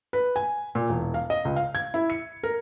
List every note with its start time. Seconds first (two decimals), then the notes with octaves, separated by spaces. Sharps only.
0.13 B4
0.36 G#5
0.75 A#2
0.89 E1
1.14 F5
1.30 D#5
1.45 C#2
1.56 F5
1.75 G#6
1.94 E4
2.10 C#7
2.43 A#4